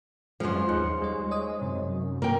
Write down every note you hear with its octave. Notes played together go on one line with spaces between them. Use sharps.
F#2 F3 G#3 C5 F5
D#2 D#4 F#6 C#7
G3 C#5
C#5 D#5 D#6
F#2 C3
G2 A#3 A#4 G5